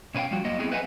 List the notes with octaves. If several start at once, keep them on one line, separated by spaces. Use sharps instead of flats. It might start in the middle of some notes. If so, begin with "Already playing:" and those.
B2 C#4 B4 F5 G5
F3 G3 F#4
F#2 A#3 D#5
A3 B3 C4 E4 G#4
B4 C5 D#5 E5 F#5 G#5